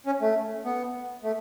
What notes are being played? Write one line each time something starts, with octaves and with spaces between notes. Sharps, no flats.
C#4
A3
B3
A3